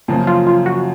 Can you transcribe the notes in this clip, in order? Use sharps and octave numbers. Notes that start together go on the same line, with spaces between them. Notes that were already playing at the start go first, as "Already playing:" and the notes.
F#2 C#3 F3 A#3
F4
F4
F#4